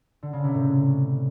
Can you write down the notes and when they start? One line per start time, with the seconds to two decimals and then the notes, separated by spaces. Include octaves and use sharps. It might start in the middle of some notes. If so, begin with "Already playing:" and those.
0.23 D3
0.33 C#3
0.44 C3
0.54 A2